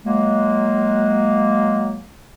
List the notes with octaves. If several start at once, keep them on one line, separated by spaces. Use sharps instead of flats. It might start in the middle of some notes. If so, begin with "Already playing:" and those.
F#3 G#3 A#3